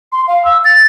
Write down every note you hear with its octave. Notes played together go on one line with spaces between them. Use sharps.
C6
F5
E6
A6